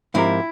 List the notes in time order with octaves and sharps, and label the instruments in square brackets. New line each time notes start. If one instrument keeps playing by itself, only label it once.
[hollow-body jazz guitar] G#2 F3 C4 G4 A#4 [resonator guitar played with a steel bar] E4